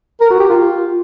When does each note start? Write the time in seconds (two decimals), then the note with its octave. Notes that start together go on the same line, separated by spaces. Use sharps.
0.21 A#4
0.30 F#4
0.40 G4
0.50 F4